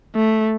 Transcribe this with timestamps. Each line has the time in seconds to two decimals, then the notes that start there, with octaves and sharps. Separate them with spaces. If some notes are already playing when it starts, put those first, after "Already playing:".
0.15 A3